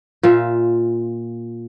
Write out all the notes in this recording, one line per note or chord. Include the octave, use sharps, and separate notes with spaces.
A#2 F4 E5